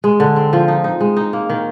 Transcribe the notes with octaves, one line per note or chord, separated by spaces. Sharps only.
G#3
D3
C4
F3
D#4
D#4
G#3
D#4
A#3
D#3